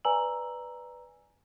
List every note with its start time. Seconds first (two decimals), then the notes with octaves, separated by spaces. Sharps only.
0.05 B4 D5 G#5 A#5 E6 F#7